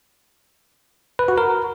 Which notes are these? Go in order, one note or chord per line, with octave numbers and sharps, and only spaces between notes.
B4
F#4
A#4